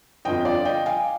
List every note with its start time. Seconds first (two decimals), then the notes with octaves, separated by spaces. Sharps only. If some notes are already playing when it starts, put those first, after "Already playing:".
0.25 G1 F2 D3 F3 D#5 G5
0.45 D5 F5
0.65 D#5 G5
0.86 F5 G#5